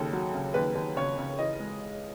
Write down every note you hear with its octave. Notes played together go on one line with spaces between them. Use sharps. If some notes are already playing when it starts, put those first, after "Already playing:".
Already playing: D#2 C#3 A4
F#3
C#3
D#2 B4
D#2
C#3 C#5
C#3
E3 D#5
G#3